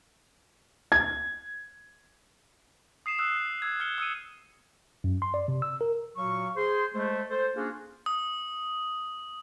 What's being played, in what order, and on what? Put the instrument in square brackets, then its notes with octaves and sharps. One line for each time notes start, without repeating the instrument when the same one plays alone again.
[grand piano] G#6
[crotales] D#6 C7 D#7 E7
D#6 E6 F#6
E6
D#6 E6 G#6
E6 F6 G6 G#6 C#7 G7
D#6 E6 C#7 D#7
[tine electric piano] F#2
C6
D5
C3
E6
A#4
[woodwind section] A#2 F#3 F#4 F5 C#6
G#4 C5 C6
G#3 A3 C5
A4 C5
A#3 C#4 D4 F4 F#4 G#4
[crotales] D#6